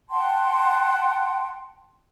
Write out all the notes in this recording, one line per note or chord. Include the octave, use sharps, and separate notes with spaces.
F#5 G5 A5 C6